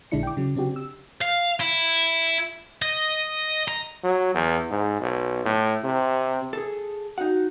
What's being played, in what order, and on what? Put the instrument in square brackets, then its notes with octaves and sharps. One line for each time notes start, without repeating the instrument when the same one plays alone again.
[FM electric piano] A#1 D3 G#3 D4 E4 C#7
G5 D6
C#3 F#3
C#3 C4 D4 F#4 G4
E6
[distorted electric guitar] F5
E4
D#5
A#5
[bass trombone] F#3
E2
G#2
B1
A2
C3
[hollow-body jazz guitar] G#4 A4
[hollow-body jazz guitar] D#4 F#5 [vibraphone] F#4